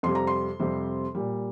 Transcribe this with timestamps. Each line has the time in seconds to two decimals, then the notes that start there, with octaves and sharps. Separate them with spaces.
0.03 F2 C3 G3 C6
0.15 A#5
0.27 C6
0.60 F2 C3 G3
1.15 A#2 G3